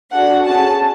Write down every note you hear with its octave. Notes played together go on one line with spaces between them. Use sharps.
D4 F#4 A4 F#5
C#4 G#4 A5